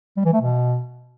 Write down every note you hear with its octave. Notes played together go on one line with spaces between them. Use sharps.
G3
E3
A3
B2